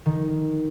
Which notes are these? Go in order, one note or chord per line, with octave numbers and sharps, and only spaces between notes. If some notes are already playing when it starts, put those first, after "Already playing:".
D#3